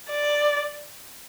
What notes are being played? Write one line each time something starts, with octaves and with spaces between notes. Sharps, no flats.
D5